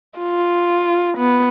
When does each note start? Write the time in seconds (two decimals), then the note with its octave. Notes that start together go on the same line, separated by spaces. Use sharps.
0.19 F4
1.18 B3